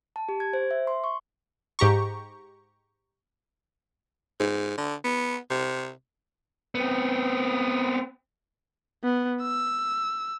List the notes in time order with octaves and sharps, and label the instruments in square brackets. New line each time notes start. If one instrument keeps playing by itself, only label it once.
[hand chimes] A5
G4
G#6
C5
E5
C6
C#6
[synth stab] G#2 G4 A#5 C#6
[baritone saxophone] G#2
D3
B3
C3
[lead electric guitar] B3 C4
[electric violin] B3
E6